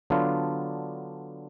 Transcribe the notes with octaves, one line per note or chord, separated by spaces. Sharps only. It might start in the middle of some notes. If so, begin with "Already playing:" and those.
D3 F#3 B3 D4 F4